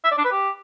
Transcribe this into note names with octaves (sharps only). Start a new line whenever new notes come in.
E5
D5
D4
B4
G4